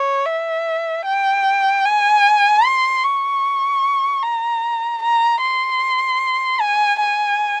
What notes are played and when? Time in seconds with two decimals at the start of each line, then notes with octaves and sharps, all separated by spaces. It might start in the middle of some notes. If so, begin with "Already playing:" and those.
Already playing: C#5
0.25 E5
1.05 G5
1.85 G#5
2.64 C6
3.04 C#6
4.23 A#5
5.02 A#5
5.42 C6
6.61 G#5
7.01 G#5